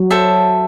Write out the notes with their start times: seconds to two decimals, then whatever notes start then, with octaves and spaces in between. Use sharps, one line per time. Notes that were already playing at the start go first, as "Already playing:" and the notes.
Already playing: F#3
0.11 A4 C5 E5 A5